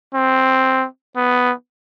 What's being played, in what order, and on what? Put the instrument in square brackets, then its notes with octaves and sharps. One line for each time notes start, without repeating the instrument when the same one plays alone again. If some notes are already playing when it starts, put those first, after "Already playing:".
[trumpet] C4
B3